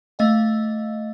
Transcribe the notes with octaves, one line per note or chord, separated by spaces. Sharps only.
A3 D#5 F5